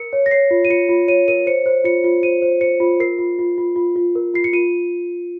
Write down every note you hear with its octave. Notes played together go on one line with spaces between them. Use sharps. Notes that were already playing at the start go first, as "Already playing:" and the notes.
Already playing: A#4 C#7
C#5
A#6
C#5 C7
F4
D#7
F4 C#7
F4
C#5 D#7
A#4 D#7
C5 C#7
C5
F4 C#7
F4
C5 D#7
C5
C5 C#7
F4
A#4 C7
F4
F4
F4
F4
F4
A#4
F4 C7
C#7
F4 D#7